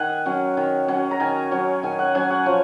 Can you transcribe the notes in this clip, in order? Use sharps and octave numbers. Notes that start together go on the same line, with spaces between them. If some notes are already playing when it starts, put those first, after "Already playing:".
Already playing: D#3 F#5 G#5
F#3 C#4
D#3
F#3 C#4
A#5
D#3 G#5
F#3 C#4
D#3 G#5
F#5
F#3 C#4 G#5
F#5
F3 C#5